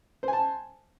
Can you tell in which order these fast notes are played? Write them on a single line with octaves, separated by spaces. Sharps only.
C5 G#5 A5